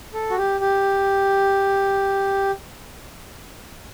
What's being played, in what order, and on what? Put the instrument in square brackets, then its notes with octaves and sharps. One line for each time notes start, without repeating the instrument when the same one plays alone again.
[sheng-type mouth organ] A4
F#4
G4
G4